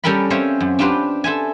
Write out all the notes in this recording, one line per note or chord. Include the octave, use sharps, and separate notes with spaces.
G3 C#4 A4 A#4 G5 B5
C4 C#4 C5 C#5 E5 F5
F#2
D4 F4 G4 B4 C5
A4 C5 E5 G#5